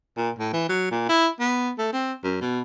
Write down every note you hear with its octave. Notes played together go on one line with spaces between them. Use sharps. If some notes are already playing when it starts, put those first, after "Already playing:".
A#2
A2
E3
F#3
A#2
E4
B3
A3
C4
F#2
B2